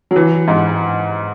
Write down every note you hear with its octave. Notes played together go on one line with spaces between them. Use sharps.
F#3
E3
G#2